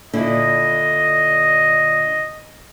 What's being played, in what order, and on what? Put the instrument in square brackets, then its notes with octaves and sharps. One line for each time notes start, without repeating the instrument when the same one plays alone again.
[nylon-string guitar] A#2 D3 E4 [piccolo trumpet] D#5